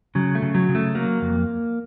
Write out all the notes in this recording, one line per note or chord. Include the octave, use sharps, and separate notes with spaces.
C#3 F#3
A3
C#3
F#3
C#3
A3
F#3 A#3
F2